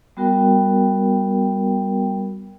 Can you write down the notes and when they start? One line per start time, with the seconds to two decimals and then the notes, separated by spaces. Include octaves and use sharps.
0.17 G3 B3 F#4 A#4 G5